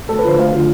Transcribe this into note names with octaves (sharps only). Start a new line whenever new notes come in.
D2 A4
B4
D3 F3 C5
D2 F5
D3 F3